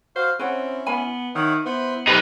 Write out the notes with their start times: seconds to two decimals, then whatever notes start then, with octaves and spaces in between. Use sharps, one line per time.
0.16 F#4 C5 F5
0.39 C4 C#4 E4 B4 C#5 F#5
0.86 B3 G#5 B5
1.35 D#3 C#5 E5 F#5
1.65 B3 E4 B4 C5
2.07 A3 C4 D#4 G4 B4